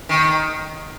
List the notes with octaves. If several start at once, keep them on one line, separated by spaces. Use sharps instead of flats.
D#3